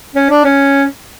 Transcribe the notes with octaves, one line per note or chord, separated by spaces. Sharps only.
C#4
D4
C#4